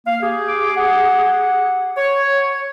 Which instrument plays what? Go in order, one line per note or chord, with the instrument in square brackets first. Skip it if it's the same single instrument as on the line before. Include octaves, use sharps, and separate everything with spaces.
[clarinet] A#3 [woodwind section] F5
[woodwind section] G4 G#4
[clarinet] D6
F#5
[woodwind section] C#5